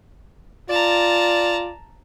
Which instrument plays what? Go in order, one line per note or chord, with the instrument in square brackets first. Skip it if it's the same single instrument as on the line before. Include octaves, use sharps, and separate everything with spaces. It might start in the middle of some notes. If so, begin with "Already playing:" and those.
[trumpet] F4 [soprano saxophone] D5 [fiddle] A5 A#5